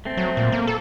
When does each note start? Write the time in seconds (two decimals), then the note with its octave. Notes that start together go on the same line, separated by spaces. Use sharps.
0.05 A3 C4
0.17 F#3
0.37 A#2
0.52 A#3
0.67 A4